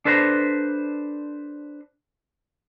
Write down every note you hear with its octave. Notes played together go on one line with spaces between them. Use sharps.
D4 A4 B4 C5 F#5 A#5